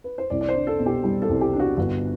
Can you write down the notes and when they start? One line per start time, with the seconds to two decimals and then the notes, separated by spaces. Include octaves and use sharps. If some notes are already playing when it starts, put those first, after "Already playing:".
0.04 B4
0.18 C5
0.30 C2 D5
0.41 D5
0.49 C5
0.54 D4
0.67 A4
0.79 B2
0.86 G4
1.04 G3 G4
1.22 A4
1.29 C2
1.41 G4
1.53 D4
1.60 F#4
1.77 G1 F#4